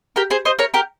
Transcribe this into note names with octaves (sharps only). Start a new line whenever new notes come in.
G4 A#4
G#4 C5
C5 D#5
A#4 C#5
G4 A#4